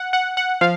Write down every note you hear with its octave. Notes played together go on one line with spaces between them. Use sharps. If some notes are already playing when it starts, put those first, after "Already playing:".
Already playing: F#5
F#5
F#5
F3 F5